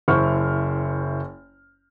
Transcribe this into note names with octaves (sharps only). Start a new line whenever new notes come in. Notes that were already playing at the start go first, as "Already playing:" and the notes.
F#1 E4 C5 C#6 F6